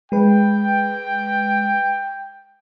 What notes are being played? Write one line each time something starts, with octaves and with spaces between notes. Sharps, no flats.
G#3 B4 G5